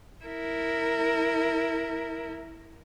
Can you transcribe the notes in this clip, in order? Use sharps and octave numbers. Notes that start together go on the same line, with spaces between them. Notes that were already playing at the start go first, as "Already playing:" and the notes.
E4 A#4